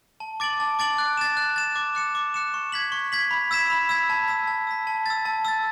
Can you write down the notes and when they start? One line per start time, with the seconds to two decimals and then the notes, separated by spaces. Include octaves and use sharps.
0.20 A5
0.40 D6 A6 D7 F#7
0.60 A5
0.79 D6 A6 D7 F#7
0.98 F#6
1.17 A6 E7
1.37 F#6
1.56 A6 E7
1.76 D6
1.95 F#6 C#7 E7
2.15 D6
2.34 F#6 C#7 E7
2.54 C#6
2.72 G#6 B6 F#7
2.92 C#6
3.12 G#6 B6 F#7
3.31 B5
3.51 E6 G#6 B6 E7
3.70 B5
3.89 E6 G#6 B6 E7
4.10 A5
4.28 E6 B6
4.47 A5
4.67 E6 B6
4.87 A5
5.06 E6 A6
5.25 A5
5.45 E6 A6